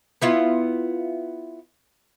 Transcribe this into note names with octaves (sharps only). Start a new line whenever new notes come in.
B3 E4 F4